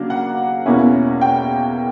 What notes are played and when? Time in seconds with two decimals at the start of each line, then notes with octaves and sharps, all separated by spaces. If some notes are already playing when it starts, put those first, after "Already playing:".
Already playing: C#3 F#3 A#3 D4
0.10 F#5
0.66 E2 B2 A#3 C#4 E4
1.21 G5